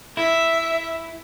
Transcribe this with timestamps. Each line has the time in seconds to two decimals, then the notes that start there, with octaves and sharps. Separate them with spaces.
0.17 E4 E5